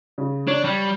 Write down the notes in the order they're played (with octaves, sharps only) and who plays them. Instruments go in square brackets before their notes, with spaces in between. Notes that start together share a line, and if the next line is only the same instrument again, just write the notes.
[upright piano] C#3
[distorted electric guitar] D4 [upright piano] C#5
[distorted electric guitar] G3